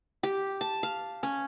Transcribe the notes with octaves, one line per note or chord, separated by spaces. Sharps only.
G4
A5
F5
C#4